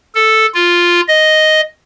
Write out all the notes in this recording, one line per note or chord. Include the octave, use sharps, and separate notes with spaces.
A4
F4
D#5